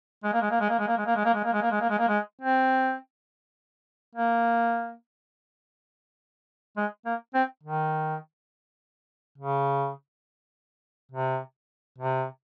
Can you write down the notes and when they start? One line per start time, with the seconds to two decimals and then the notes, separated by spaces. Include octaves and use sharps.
0.24 G#3
0.33 A#3
0.42 G#3
0.51 A#3
0.61 G#3
0.70 A#3
0.79 G#3
0.88 A#3
0.98 G#3
1.06 A#3
1.16 G#3
1.25 A#3
1.34 G#3
1.44 A#3
1.53 G#3
1.62 A#3
1.71 G#3
1.81 A#3
1.90 G#3
1.99 A#3
2.09 G#3
2.42 C4
4.15 A#3
6.77 G#3
7.06 A#3
7.34 C4
7.63 D#3
9.38 C#3
11.12 C3
11.99 C3